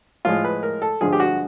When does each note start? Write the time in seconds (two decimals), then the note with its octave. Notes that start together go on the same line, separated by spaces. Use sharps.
0.25 A2 F3 G#3 F4
0.44 B4
0.63 A#4
0.82 A4
1.01 G2 D3 F3 G#3 G#4
1.13 G4
1.20 F#4